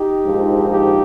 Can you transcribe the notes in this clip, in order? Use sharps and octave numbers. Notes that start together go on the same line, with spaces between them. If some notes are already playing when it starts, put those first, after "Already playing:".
Already playing: D#4 G4
A#1 G#2 F3
D#4 G4